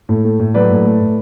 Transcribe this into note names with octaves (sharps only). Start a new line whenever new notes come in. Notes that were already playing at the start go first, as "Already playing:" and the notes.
A2
A3
A2
F#3 B4 D5
A2
A3
A2